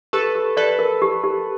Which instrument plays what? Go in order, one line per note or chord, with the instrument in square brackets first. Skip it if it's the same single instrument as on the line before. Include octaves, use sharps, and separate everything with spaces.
[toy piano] G4 [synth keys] A4 B4
[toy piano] G4
[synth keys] A4 B4 [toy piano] D5
[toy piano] A#4
G4
G4